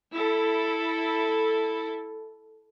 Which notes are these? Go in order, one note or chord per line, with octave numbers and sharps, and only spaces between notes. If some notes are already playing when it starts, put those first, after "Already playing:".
E4 A4